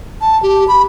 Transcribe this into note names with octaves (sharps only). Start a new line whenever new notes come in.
A5
G4
B5